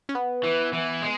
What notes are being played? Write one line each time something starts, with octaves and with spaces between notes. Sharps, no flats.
C#4
B3
E3
E3
G#3